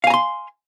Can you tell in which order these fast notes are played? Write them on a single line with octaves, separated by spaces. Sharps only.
F5 G#5 A#5 C6